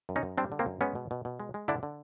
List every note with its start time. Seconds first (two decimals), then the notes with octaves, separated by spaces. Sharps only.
0.09 F#2
0.16 C#4 D#4
0.23 F#2
0.38 G3 C4 D4
0.52 D3
0.59 A#3 C4
0.66 F#2
0.81 G#3 B3 C#4
0.95 B2
1.11 B2
1.25 B2
1.40 G#3
1.54 G#3
1.68 D3 D4 E4
1.83 D3